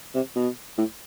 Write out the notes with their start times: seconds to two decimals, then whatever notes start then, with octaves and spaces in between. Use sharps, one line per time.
0.15 C3
0.36 B2
0.78 A2